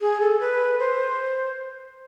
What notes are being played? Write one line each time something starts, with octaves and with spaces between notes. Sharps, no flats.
G#4
A4
B4
C5